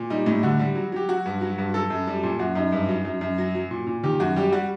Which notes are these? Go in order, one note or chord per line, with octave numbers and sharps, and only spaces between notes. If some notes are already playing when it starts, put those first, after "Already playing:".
Already playing: A#2
G3 D#4
A2 D#4
D3 F#4
G3
F#3
F#3 G4
F#3 F#4
G2
F#3
G2
F#3 A4
F#2
G3
A#2
F#2 F#4
F#2 D#4
G2
F#3
F#2
F#2
F#3
F#3
A#2
A#2
D#3 G4
F#2 F#4
G3 G4
G3 F#4